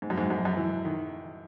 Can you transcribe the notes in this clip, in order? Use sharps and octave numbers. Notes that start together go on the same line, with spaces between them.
G#2
F#2
G#2
F#2
F#2
E3
D#3